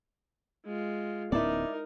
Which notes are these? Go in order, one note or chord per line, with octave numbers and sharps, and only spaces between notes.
G#3 F4
D1 B3 C#4 D#4 E4 A#4 D5